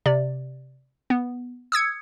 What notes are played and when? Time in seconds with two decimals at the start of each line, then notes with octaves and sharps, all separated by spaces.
0.06 C3 D5
1.10 B3
1.72 D#6 E6 G#6 C#7